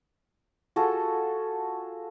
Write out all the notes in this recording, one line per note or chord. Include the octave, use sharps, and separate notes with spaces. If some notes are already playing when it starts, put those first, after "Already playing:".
F4 F#4 G#4 A4